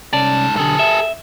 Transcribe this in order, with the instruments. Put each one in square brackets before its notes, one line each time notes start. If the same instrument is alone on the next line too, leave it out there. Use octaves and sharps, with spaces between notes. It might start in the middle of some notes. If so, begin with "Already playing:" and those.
[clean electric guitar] C2 C#4 D5 [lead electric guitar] G#2 A5
[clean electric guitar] B1 D3 [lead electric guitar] G#4 A4
[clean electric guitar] E5